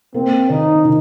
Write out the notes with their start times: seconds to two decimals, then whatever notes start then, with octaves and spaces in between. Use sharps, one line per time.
0.14 A#3 C4
0.49 D#3 D#4
0.85 D#3